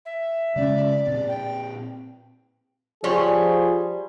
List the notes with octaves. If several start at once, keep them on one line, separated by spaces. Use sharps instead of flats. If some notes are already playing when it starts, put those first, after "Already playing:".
E5
C#3 G#3 C#4 D5
A#2 C4
G5
F3 G3 G#4 C5 C#5